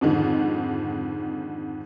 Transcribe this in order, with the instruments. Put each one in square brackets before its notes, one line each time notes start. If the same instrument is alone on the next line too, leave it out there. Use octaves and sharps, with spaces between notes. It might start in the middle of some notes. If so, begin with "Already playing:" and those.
[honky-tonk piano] F2 G#2 D3 D#3